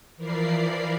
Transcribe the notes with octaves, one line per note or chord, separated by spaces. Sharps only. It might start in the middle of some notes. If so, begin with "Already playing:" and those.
E3 F3 A#4 D5 B5 C7